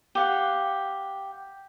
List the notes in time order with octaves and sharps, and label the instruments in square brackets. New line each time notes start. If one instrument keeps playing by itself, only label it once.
[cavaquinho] G4 F5 F#5